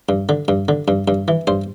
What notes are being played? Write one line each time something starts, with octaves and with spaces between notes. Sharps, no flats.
G2
D3
G2
D3
G2
G2
E3
G2 C5